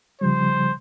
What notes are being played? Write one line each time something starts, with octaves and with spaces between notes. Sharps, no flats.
C#3 F3 G3 C5